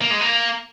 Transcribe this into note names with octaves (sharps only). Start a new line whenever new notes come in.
A#3
G#3
A#3